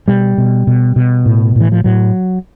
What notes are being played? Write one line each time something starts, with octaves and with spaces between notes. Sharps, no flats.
B2 G3
B2
B2
B2
A2
A2 E3
F3
A2 F#3